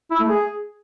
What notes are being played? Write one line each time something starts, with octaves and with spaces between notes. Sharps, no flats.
E4
A3
G#4